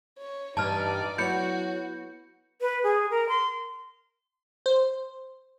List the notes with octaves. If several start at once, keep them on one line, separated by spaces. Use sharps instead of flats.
C#5
G2 E3 D#4 D5 A5 F6
F#3 B3 E4 F#4 G6 C#7
B4
G#4
A#4
C6
C5